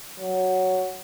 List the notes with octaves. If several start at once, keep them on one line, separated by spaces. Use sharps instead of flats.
F#3